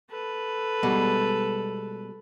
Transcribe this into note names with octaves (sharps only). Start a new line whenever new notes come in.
A4 B4
B2 G3 G#3